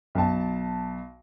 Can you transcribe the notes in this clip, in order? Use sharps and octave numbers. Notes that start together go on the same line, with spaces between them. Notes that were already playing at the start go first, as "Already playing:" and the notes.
B1 A5